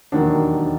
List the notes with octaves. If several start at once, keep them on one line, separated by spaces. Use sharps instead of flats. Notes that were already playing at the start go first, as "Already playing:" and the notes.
E1 D#2 D#3 F#3 D4